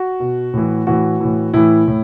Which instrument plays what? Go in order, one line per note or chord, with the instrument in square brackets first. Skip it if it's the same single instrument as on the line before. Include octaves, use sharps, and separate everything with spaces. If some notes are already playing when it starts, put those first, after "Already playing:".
Already playing: [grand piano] F#4
B2
A2 E3
A2 E3 F#4
A2 E3
A2 E3 E4
A2